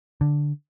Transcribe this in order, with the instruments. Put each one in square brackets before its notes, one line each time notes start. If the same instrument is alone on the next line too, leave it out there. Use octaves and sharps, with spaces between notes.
[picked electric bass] D3